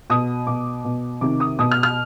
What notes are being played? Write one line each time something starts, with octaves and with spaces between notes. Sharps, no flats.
B2 D#6
B2 D6
B2
C3 D#3 D6
D#6
B2 D#6
F6
F6